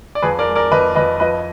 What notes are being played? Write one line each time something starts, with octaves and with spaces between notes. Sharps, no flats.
D5
F2 G#4 B4
A#4 D5
G#3
A#4 D5
F2 B4 D#5
F2 B4 D#5
F3 B4 D#5